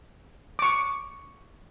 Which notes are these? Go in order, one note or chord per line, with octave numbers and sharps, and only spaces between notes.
C#6 D6